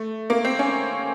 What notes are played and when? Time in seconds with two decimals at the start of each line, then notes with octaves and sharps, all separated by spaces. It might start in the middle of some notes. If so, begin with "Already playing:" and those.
Already playing: A3
0.30 A#3
0.45 C4
0.59 C#4